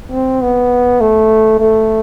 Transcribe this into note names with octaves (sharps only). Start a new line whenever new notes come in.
C4
B3
A3
A3